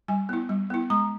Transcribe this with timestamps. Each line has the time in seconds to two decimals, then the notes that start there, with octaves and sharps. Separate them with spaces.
0.08 G3 G#5
0.29 B3 E4
0.49 G3
0.70 B3 E4
0.90 G#3 A#5